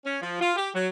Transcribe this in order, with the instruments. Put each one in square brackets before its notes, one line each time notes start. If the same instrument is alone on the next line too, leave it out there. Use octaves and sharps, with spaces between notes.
[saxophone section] C#4
F3
F4
G4
F#3